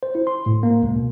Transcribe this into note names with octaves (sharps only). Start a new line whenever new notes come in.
C5
E4
C6
A2
A#3
C#2
B2